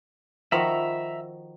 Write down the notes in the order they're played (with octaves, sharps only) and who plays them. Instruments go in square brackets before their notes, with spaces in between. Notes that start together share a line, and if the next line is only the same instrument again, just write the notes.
[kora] D#3 F3 F#4 [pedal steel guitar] E5 A#5 B5